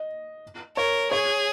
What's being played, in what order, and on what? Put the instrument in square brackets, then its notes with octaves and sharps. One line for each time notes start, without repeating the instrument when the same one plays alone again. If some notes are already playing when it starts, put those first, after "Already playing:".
Already playing: [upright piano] D#5
[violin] A#4 [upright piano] C#5
[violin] G#4 [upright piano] C#5